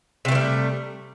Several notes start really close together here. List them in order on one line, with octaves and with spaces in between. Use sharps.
C3 A3 E3 G3